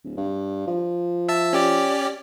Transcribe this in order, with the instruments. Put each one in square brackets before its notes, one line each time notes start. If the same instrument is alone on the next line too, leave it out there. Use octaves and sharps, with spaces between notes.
[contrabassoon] D1
G2
F3
[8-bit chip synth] E5 A5 E6
C#4 G4 D5